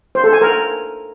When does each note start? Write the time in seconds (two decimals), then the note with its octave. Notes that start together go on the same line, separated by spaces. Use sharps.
0.15 C5
0.24 A4
0.33 G#5
0.41 A#4